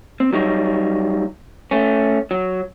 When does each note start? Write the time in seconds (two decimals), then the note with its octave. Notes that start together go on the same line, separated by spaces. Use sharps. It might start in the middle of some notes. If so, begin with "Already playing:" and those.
0.20 C4
0.33 F#3 G3 D#4 C#5
1.71 A3 C#4
2.31 F#3